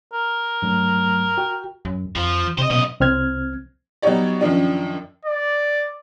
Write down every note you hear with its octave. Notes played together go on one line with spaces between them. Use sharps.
A#4
G2 F#3 A3
F#4 G5
F#2
F2 F3
C3 C5 D#5
F#2 B2 D#5
C2 C4 F6 G#6
F#3 G3 B3 D#4 C#5 D5
F#2 D#3 F3 D4
D5